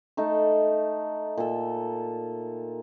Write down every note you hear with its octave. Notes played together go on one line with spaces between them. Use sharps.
A3 D#4 A4
A#2 A4